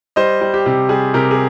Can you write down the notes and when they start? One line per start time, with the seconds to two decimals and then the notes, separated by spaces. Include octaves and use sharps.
0.16 G3 C5 D#5
0.41 G3
0.54 G4
0.66 C3
0.89 G3 G#4
1.14 C3 G4 A#4
1.31 G#4